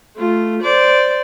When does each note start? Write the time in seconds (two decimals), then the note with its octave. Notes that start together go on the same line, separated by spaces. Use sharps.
0.16 A3 F4
0.62 C5 D5